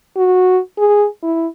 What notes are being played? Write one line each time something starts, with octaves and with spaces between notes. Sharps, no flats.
F#4
G#4
E4